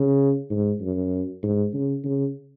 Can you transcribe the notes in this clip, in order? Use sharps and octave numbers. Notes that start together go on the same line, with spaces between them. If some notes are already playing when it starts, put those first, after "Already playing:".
Already playing: C#3
G#2
F#2
G#2
C#3
C#3